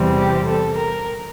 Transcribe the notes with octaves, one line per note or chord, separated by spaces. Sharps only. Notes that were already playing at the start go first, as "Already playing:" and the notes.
Already playing: E2 C3 G3 C4
G4
A4
A#4